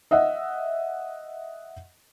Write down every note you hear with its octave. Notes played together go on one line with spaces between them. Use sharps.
D#5 E5 F#5